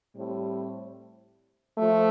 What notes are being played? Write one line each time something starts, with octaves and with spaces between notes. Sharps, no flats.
A2 G3 C4
F3 A3